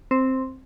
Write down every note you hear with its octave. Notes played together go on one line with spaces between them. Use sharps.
C4